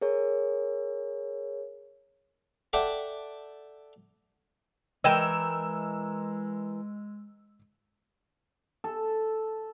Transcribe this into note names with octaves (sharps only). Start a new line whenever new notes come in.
G#4 A#4 C#5
A4 D5 E5 F#5 G5
E3 G#3 A#4 D#5 G5 E6 E7
A4